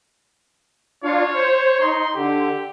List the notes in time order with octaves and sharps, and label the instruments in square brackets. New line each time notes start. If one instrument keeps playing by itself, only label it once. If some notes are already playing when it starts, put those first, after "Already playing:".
[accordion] D4 F4 F5 [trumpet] C#5
[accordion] C5
[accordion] D#4 [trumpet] C6
[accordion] D3 [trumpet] G4